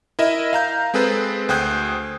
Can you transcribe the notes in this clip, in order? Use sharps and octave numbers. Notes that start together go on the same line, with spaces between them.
E4 A#4 D#5 E5
F5 A#5 G6
G#3 C4 G#4 A4 B4 C5
D2 C5 G5 D#6 F#6 G#6